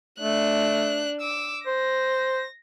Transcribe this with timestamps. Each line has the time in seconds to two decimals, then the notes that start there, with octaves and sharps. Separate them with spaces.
0.20 A3 D4 F#6
1.21 D6 E6
1.67 C5 A#6